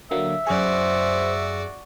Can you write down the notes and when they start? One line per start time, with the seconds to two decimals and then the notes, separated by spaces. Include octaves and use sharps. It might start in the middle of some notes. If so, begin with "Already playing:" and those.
0.11 D3 F#3 A#3 E5
0.47 F#2 F#4 G#4 C5 D5